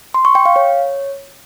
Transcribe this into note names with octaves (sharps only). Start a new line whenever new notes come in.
C6
C#6
G5
F5
C#5